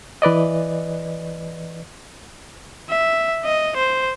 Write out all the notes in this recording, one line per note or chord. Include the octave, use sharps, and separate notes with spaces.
E3 B4 D5 D#5
E5
D#5
C5